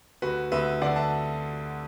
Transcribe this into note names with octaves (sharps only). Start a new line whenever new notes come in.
D2 F#4 B4
D2 B4 E5
D3 D5 F#5
E5 A5